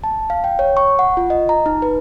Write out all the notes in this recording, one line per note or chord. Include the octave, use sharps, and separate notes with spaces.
A5
F5
G5
C#5
C#6
F#5
F4
D#5
A#5
D#4
B4